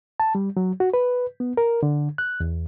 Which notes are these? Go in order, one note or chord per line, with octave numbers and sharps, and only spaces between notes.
A5
G3
F#3
F#4
B4
B3
A#4
D3
F#6
E2